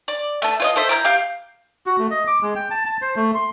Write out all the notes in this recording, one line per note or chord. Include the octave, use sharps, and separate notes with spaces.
D5
A3 A5
F4 C#5 D#5
A4 C5 E5
E4 A#5 E6 G6
G4 F5 G6
F#4
A3
D#5
D6
G#3
G5
A5
A5
C5
A3
C6